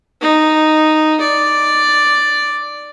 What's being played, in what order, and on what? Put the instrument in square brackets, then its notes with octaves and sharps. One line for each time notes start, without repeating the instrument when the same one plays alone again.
[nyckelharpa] D#4
D5